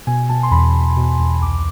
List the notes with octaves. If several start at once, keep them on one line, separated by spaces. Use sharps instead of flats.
B2 G#5
B2 A5
C6
E2 B5
E2
B2
E2
C2 D6